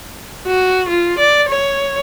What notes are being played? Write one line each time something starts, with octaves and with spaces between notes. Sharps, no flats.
F#4
F4
D5
C#5